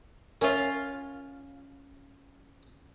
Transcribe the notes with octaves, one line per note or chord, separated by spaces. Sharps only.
C#4 F4 A#4 C#5 E5